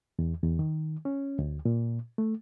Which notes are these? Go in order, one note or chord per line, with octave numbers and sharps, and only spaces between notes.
E2
E2
D#3
C#4
D2
A#2
A3